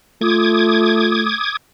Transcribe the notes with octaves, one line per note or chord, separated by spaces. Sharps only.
A3 F4 D6 D#6 G#6